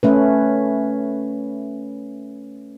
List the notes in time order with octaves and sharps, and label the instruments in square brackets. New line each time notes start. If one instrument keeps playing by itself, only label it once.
[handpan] A3 C#4 B4